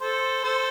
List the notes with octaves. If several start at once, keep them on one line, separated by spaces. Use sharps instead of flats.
A4 C5
A4 C5